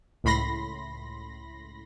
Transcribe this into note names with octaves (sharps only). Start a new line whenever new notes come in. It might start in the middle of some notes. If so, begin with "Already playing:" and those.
C#2 A2 B5 C6 A#6